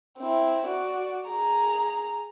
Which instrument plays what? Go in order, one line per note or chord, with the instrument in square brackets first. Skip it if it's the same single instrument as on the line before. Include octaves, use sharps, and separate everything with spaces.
[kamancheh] C4 E4
F#4 D5
G#4 A#5